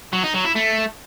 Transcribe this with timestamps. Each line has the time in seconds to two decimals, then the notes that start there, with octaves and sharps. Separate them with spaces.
0.13 F#3
0.23 D#4
0.34 F#3
0.45 E4
0.55 A3